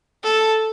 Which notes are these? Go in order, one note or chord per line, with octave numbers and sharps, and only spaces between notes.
A4